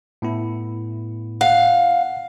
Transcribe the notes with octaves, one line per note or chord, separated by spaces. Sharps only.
A2 B3 E4
F5 F#5